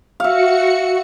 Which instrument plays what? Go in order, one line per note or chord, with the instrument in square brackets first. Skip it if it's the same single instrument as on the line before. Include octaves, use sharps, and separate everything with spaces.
[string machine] F#4 C#7 [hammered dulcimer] E5 F5